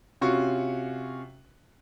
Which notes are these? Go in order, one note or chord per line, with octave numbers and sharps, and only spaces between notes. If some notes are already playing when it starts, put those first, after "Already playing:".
C3 C#4 F4 F#4 C#6